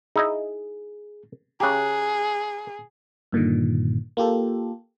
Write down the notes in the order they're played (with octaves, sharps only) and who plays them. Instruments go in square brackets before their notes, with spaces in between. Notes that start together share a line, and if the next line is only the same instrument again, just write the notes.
[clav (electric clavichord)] D#4 E4 D#5 [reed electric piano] G#4
[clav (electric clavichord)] C#3 G4 [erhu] G#4 [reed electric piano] A#5 F#6
[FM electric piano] G2 A#2 D3 D#3
A#3 F4 G4 A4